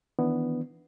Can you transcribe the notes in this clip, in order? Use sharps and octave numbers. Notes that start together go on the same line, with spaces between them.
D#3 E3 B3 D4